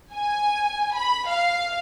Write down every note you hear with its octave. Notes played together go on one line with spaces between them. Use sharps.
G#5
B5
F5